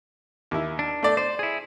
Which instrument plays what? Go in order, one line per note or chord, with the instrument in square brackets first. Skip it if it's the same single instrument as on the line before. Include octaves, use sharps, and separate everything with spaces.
[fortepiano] D#2 E4
[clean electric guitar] D4
[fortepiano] A3 D5
[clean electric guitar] C5 [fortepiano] D5
[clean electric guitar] E4 G#4